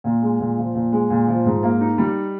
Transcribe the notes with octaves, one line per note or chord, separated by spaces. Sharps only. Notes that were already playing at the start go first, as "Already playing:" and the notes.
A#2
G#3
A#2
F3
A#2
G#3
A#2
F3
G#2
A#3
D#4
G3